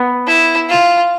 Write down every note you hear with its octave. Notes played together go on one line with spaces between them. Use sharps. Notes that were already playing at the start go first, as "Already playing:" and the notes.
Already playing: B3
E4
F4